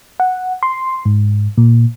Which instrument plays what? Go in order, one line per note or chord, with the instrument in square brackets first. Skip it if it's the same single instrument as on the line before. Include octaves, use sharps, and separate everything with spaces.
[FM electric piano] F#5
C6
G#2
A#2